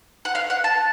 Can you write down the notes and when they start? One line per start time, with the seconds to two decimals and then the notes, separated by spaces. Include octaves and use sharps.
0.25 F#5
0.35 F5
0.50 F#5
0.64 A5